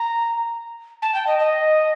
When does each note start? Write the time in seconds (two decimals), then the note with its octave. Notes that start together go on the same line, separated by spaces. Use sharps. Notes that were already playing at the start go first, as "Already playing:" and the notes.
Already playing: A#5
1.02 A5
1.14 G5
1.27 D#5
1.39 D#5